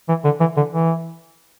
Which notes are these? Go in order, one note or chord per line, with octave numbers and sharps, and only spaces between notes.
E3
D3
E3
D3
E3